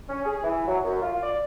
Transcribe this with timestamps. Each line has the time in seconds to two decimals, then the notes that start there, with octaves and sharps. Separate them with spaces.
0.09 C#4
0.25 G#4
0.43 E3
0.67 F#3
0.84 F#2
1.02 F4
1.22 D5